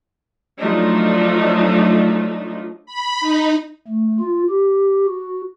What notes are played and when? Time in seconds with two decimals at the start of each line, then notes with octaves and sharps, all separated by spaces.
0.60 F3 F#3 A3 D4 D#4 F4
2.86 B5
3.20 D#4
3.88 A3
4.20 F4
4.50 G4
5.06 F#4